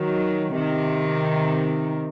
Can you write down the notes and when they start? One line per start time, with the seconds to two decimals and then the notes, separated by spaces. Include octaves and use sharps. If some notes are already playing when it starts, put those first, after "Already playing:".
Already playing: D#3 F#3
0.55 C3 D#3